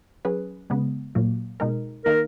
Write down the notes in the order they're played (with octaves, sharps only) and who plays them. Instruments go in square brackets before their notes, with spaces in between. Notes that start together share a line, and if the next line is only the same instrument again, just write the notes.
[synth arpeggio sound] F#3 C#4 G#4 B4
C#3 G#3 B3
A#2 F#3 A#3
B2 G#3 D#4 A#4
[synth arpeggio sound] D#3 A#3 D#4 [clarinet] A#4